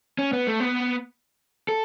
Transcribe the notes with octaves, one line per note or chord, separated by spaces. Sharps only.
C#4
B3
A3
B3
A4